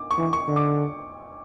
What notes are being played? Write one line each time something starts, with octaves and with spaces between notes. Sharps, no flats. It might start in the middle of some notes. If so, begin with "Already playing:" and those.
Already playing: D6
C#6
E3
C#6
D3
D6